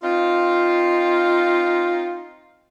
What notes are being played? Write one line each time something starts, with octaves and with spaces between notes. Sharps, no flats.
C4 D#4 F4